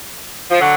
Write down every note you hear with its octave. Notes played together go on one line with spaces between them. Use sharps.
F3
D3 F#3